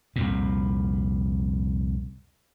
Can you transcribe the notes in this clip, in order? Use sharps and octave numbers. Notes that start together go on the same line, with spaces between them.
C2 F2 A#2